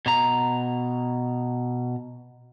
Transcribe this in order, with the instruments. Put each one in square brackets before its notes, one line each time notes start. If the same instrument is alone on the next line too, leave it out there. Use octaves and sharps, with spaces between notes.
[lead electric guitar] B2 A#5